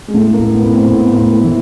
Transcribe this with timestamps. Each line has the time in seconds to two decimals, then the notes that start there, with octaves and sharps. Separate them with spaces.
0.08 G#3
0.14 A2 A3
0.33 A#3
0.40 A2
0.53 B3
0.66 A2
0.73 C4
0.92 A2 B3
1.12 A#3
1.18 A2
1.31 A#3
1.44 E3